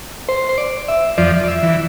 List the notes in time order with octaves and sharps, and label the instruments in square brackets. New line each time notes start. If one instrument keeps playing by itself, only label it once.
[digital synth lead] C5
C5
D5
E5
[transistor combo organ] F2 F3 [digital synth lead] D5
[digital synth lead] D5
E5
[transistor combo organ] E3